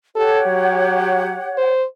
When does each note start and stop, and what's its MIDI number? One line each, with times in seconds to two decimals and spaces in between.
0.16 1.72 67
0.16 0.41 69
0.16 1.72 73
0.16 1.72 78
0.47 1.35 54
1.58 1.85 72